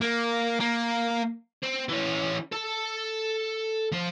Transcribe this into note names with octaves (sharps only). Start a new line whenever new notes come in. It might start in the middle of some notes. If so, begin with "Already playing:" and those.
A#3
A#3
C4
E3 C#4
A4 A5
F3 C5